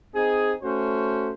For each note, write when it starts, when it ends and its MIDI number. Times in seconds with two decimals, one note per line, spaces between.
0.15 0.52 60
0.15 0.52 63
0.15 0.52 68
0.63 1.31 57
0.63 1.31 61
0.63 1.31 66
0.63 1.31 72